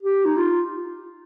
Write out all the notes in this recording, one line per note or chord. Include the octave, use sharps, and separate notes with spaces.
G4
D#4
F4